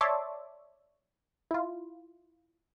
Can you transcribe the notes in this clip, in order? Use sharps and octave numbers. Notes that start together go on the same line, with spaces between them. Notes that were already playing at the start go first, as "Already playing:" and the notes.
C#5 D5 E5 A5 C6 D6
E4 F4